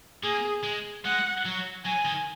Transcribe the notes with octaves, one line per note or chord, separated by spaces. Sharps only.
A#3 G#4
G#3
G#3 F#5
F#3
F#3 G#5
D#3